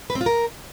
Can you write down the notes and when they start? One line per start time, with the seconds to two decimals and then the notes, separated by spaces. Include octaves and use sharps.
0.10 B4
0.15 C4
0.21 F4
0.26 A#4